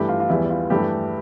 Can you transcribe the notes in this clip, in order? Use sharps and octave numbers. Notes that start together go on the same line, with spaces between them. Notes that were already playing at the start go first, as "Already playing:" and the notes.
Already playing: G2 E3 A3 G4
F4
F4
E2 E3 G3 E4
F4
G2 E3 A3 G4